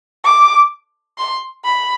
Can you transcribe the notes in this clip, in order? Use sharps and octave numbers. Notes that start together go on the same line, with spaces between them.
D6
C6
B5